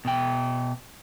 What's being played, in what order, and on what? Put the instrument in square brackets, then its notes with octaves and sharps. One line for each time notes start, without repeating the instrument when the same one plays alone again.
[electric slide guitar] B2 G5